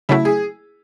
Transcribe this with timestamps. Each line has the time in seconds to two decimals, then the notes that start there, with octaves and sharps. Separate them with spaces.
0.09 C#3 F#3 A3 E4
0.25 G#4